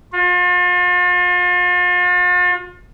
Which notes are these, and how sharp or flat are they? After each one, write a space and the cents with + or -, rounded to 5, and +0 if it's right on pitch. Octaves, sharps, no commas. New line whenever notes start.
F4 +40